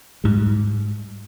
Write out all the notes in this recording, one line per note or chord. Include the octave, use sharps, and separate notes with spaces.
G#2 G3